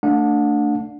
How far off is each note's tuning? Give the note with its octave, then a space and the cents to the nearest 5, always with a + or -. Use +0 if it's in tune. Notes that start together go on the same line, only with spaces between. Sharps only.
A3 +20 D4 +0 F#5 -40